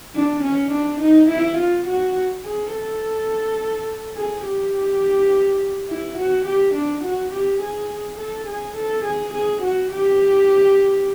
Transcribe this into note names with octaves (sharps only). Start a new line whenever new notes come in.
D4
C#4
D4
D#4
E4
F4
F#4
G#4
A4
G#4
G4
E4
F#4
G4
D4
F#4
G4
G#4
A4
G#4
A4
G#4
G#4
F#4
G4